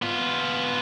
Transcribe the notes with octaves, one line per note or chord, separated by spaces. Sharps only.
B3 F4